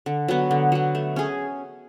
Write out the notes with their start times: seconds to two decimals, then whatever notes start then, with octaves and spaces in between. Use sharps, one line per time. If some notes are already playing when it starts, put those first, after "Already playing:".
0.06 D3
0.28 F#3 B3
0.51 D3
0.72 F#3 B3
0.95 A3
1.16 C#4 G#4